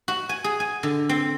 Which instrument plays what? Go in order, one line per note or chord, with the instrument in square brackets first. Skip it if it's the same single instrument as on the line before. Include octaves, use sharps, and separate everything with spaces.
[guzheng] F#4
G#5
G#4
G#5
D3
C4